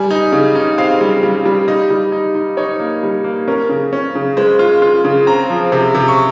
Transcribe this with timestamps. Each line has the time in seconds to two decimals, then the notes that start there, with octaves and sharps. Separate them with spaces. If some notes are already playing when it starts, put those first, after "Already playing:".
Already playing: G3 G#5
0.11 D#4
0.32 C#3
0.55 D#4
0.78 C4 F5
1.01 G3
1.23 G3
1.45 G3
1.68 D#4 D#5
1.90 G3
2.12 D#4
2.35 D#4
2.57 D#4 C#5
2.80 A#3
3.03 G3
3.24 A#3
3.48 C#4 A#4
3.69 C#3
3.93 C#4
4.15 C#3
4.37 G#3 C5
4.59 F4
4.82 F4
5.05 C#3
5.27 C4 A#5
5.50 F3
5.72 C3
5.95 C3
6.08 C#6